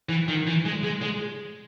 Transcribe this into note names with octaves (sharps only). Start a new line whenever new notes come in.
E3
D#3
E3
G#3
G#3
G#3